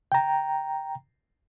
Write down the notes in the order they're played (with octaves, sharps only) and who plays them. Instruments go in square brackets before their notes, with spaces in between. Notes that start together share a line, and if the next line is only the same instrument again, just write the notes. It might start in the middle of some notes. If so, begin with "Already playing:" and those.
[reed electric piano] G5 A#5